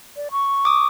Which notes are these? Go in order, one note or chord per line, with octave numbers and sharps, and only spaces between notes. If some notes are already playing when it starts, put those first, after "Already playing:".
D5
C#6
D6 D#6